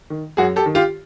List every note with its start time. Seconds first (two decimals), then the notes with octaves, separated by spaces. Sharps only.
0.10 D#3
0.37 F#2 F#4 G#4
0.56 G4 A4
0.66 D#3
0.75 F4 G4